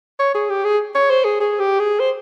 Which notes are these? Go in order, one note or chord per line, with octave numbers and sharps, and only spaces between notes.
C#5
G#4
G4
G#4
C#5
C5
G#4
G#4
G4
G#4
C5